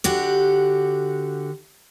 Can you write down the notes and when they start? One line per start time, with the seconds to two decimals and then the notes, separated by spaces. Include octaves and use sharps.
0.04 D3 F#4 G4